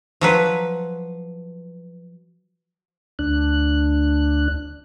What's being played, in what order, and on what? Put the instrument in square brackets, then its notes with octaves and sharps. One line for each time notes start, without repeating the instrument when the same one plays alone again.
[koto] F3 F#3 B4
[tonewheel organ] D2 D4 F#6